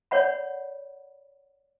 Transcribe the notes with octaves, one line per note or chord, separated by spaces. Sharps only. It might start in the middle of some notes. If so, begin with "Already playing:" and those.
C#5 D5 F#5 B5